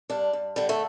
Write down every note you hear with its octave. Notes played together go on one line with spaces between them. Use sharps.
G2 D4
G2
D3 G3
A3